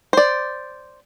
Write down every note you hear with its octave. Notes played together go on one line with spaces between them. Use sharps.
C5 D5